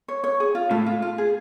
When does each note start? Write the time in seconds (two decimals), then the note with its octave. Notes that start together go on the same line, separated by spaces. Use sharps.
0.08 C#5
0.24 C#5
0.40 G#4
0.55 F4
0.71 A2 A3 F4
0.86 F4
1.02 F4
1.18 G#4